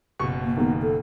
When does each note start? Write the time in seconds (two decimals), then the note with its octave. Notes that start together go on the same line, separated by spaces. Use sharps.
0.19 F#1 B2 C#6
0.43 A#3
0.57 D#3 A#3 B3
0.82 A4